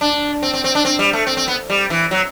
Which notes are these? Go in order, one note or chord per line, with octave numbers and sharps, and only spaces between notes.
D4
C4
C4
C4
D4
C4
G3
A3
C4
C4
B3
G3
E3
F#3